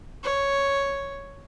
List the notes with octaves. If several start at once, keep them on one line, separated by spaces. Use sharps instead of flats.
C#5